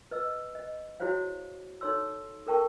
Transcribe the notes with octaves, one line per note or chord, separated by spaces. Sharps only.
B4 D#5 E6
D#5
E4 F#4 G#4 C5 C#5 F5
D#4 A4 C#5 C6 E6
A4 A#4 G5 A5 C#6